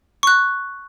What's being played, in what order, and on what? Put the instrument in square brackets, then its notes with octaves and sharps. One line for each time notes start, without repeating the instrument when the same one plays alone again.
[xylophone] C#6 F#6